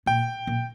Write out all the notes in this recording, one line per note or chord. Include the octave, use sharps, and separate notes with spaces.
A#2 G5
A#2